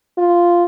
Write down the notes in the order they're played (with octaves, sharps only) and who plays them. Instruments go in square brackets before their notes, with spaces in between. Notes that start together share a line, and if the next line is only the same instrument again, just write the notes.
[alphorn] F4